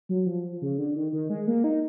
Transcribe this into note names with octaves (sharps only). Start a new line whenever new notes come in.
F#3
F3
C#3
D3
D#3
D#3
G#3
A#3
D#4